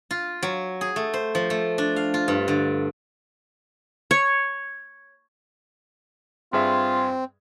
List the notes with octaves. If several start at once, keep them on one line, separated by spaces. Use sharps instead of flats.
F4
F#3
G#4
A3
C5
F3
A3
D4
F5
F4
G2
D3
C#5
G2 C4 F4 G#4 E5